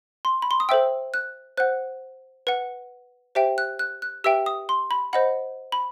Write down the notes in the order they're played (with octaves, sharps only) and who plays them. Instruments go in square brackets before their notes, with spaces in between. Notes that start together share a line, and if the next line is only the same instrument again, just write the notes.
[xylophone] C6
B5
C6
D#6
A4 C5 E5 G5 E6
F#6
C5 F#5 F#6
B4 F#5
G4 C5 E5 G5
F#6
F#6
F#6
G4 B4 E5 G5 E6
D#6
C6
B5
C5 D#5 F#5 B5
B5